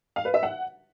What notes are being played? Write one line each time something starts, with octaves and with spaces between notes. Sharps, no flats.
F5
B4
E5
F#5